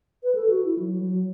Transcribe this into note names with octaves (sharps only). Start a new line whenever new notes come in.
B4
A4
F#4
E4
F#3
F#3